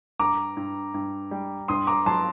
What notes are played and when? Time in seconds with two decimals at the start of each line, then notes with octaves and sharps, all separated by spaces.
0.20 G2 A#5 D6
0.57 G2
0.94 G2
1.31 G3
1.68 G2 C6 D#6
1.87 A#5 D6
2.06 F#3 A5 C6